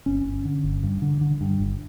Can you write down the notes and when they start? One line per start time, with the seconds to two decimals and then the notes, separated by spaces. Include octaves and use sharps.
0.06 G1 C#4
0.25 G1
0.45 D3
0.64 G1
0.83 G2
1.02 D3
1.21 D3
1.41 G2
1.60 G1